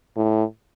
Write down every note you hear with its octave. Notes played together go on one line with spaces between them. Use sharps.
A2